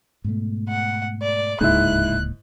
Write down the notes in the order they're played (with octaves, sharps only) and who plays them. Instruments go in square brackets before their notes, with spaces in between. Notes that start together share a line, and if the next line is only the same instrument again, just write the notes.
[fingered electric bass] G#2 B2 A3
[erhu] F#5
D5
[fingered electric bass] D1 C#2 A#3 [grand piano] G#2 E4 [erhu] F#6